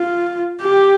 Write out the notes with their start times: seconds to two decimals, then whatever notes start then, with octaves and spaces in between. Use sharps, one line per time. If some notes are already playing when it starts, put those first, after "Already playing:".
Already playing: F4
0.62 G4